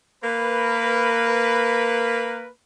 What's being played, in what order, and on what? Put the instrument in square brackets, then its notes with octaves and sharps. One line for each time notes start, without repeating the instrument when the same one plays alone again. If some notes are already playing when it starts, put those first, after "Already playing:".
[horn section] A#3 A#4 B4